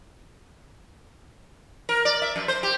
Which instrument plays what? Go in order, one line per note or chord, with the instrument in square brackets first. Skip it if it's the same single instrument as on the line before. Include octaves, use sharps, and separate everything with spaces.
[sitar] A#4
D5
E5
F#2
C5
G4